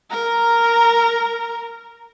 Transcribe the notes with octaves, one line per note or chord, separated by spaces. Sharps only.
A#4 A#5